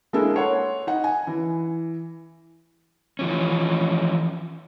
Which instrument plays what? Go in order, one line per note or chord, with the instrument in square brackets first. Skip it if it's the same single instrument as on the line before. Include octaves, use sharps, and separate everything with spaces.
[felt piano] G#3 A#3 D4 E4 A4
C#5 F#5 C6
D#4 F#5
G#5
E3
[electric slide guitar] E3 F3 C#4